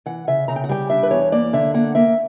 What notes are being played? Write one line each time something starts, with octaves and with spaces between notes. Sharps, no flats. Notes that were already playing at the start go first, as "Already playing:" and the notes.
E3 F#5
C#3 E5
C#3 A#5
G5
F#5
G3 G5
D4 E5
B4
E2 C#5
A#3 D5
D3 E5
A#3 F#5
A#3 E5